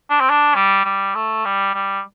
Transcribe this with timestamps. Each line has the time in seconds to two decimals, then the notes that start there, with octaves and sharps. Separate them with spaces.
0.10 D4
0.20 C4
0.30 D4
0.55 G3
0.85 G3
1.15 A3
1.45 G3
1.74 G3